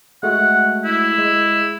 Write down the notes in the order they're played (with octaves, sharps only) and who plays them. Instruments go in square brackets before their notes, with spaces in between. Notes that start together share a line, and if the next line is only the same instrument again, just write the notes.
[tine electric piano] G#3 A3 F#4 [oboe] F#5
[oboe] E4
[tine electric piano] G#3